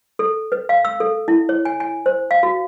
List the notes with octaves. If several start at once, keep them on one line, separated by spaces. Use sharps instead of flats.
A4
B4
F5
E6
A4
E4
C#5
G#5
G#5
C5
F5
F#4